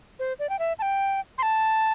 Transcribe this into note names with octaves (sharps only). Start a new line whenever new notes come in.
C5
D5
G5
E5
A5
G5
C6
A5